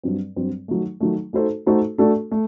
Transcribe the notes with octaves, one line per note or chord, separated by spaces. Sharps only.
G2 F#3 C4
G2 F#3 C4
D#3 F#3 A3
D#3 F#3 A3
A3 D#4 F#4 A4 C5
A3 D#4 F#4 A4 C5
A3 D4 F#4 A4
A3